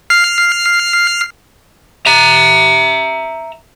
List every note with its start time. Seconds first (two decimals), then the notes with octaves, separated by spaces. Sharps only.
0.10 F6 C7
2.06 E5 A#5